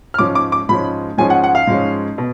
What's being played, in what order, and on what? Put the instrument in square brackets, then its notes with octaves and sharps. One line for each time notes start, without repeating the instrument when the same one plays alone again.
[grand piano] F6
G#2 F3 G#3 C#4 D6
D6
D6
G#2 F3 G#3 C#4 B5
G#2 F3 G#3 C#4 G#5
F#5
F#5
F5
G#2 F3 G#3 C#4
B2